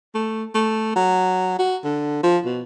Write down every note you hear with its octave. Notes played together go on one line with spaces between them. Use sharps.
A3
A3
F#3
F#4
D3
F3
B2